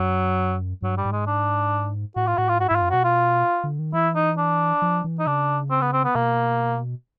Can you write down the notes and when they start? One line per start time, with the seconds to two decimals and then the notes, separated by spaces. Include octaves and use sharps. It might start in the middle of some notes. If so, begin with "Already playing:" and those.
Already playing: F#2 F#3
0.82 G2 F#3
0.97 G3
1.05 G#2
1.12 G#3
1.27 D4
2.16 A2 F#4
2.27 F4
2.38 A2 F#4
2.49 F4
2.60 G#2 F#4
2.68 E4
2.71 G#2 F4
2.82 F#2
2.90 B2 F#4
3.04 F4
3.64 D3
3.79 D#3
3.93 E3 E4
4.15 D#4
4.38 D4
4.82 F3
5.04 E3
5.19 D#4
5.27 C#3 D4
5.71 C4
5.81 B3
5.93 C4
6.04 B3
6.15 B2 A#3